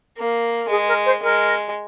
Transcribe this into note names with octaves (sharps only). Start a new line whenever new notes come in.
A#3
G#3 G#4
A#4
C5
G#3 A#4